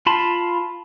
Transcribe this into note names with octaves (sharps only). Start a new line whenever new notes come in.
F4 A5 B5 C6